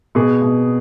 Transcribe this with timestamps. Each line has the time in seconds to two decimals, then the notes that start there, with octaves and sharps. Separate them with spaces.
0.15 B2 G#4
0.42 B2